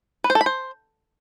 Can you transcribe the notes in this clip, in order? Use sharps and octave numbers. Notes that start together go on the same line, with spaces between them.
B4
C5
A4
B5
C5